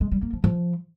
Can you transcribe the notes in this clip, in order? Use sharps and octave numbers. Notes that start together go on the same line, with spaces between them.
G#3
G3
A#3
F3
F3